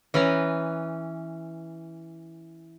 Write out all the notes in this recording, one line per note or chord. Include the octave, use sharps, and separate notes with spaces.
E3 C#4 B4 A#5